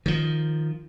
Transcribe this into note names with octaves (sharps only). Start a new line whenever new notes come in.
D#3 F3